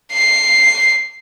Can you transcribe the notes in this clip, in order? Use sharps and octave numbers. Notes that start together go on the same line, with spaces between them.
C7